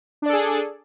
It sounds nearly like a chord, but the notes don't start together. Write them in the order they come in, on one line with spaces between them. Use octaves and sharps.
D4 D5 A4 G#4